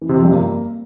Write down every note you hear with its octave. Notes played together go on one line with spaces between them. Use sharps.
E3
C3
F2
G2
A#3